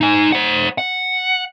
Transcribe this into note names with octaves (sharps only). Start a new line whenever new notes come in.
D#4 G#5
C5 F#5
F#5